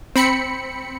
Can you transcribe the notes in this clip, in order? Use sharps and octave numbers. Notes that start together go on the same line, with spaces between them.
C4 B5 C#7